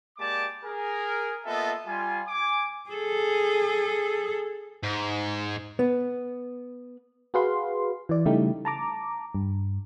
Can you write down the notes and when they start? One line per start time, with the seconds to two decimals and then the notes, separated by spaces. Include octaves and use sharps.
0.17 G#3 A#3 G4 D5 A5 D6
0.64 G#4 A#4
1.45 A#3 B3 F4 A4 D#5 E5
1.85 G3 F4 G#5
2.27 G#5 D6
2.90 G#4 A4
4.83 G#2
5.79 B3
7.34 F#4 G#4 B4 F5 C6
8.09 E3 D5
8.25 C#3 G3 A3 D#4 E4 G4
8.65 A5 A#5 D6
9.35 G2